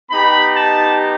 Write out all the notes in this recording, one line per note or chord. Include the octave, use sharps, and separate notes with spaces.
B3 D#4 G4 B5
A5